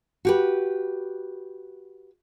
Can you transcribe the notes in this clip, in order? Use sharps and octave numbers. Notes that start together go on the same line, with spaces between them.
F#4 G4 B4